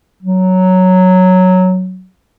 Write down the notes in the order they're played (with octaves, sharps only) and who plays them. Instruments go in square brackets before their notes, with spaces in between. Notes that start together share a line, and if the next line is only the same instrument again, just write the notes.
[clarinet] F#3